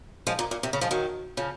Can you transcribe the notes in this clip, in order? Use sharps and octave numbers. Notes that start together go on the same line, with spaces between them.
F3 G#3
A#2
A#2
C3
C#3
F3 G#3
D#3 F#3
C#3 F3